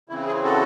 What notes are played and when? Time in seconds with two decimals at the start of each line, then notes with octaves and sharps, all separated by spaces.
0.09 C#3 E3 C4 E4
0.27 E4 G#4
0.44 F#4 A4